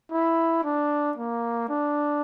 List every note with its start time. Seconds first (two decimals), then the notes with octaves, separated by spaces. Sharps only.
0.12 E4
0.65 D4
1.17 A#3
1.69 D4